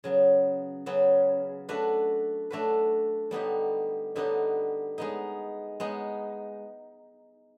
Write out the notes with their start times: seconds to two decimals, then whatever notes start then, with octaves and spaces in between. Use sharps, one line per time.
0.04 C#3 F#3 B3
0.86 C#3 F#3 B3
1.69 A3 D4 F#4 B4
2.50 A3 D4 F#4 B4
3.31 D3 G3 B3 D#4 G4
4.15 D3 G3 B3 D#4 G4
4.98 G#3 B3 D#4
5.80 G#3 B3 D#4